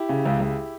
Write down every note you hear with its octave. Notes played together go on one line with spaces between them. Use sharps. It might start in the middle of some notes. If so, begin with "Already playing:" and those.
Already playing: E4 G4
C#3
C#2
C#2